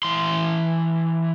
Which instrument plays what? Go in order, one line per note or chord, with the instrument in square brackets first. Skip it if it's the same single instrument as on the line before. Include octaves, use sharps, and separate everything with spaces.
[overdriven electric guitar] E3 C6